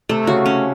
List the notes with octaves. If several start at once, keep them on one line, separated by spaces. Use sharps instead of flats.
C3 A3
C#3 F#4
C#4